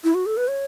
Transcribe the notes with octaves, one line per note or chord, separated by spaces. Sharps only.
E4
F#4
A4
B4
C#5